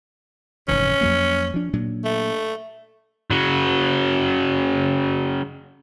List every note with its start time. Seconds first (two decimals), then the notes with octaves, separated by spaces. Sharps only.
0.68 F1 G#2 E3 C#4
1.01 F2 F#3 A#3
1.54 F3 D4
1.73 A#2 F#3 D4
2.04 A3
3.31 C#3 F#3